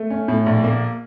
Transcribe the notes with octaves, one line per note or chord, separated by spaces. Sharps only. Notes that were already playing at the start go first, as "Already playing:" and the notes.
Already playing: A3
C#4
A2
A#1
A#3